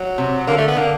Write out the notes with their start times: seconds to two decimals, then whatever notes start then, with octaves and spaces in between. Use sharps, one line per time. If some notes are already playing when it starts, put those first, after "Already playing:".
Already playing: F#3
0.18 C3
0.47 D3 A#3
0.58 A3
0.68 B3
0.76 D3 A#3